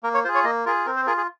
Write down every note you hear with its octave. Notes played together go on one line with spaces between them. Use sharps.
A#3 A#4
C#5
F4 G#4 C5
C#5
A#3 D#5
F4 G#4 A#4
C4 A#4
C5
F4 G#4 A#4
G#4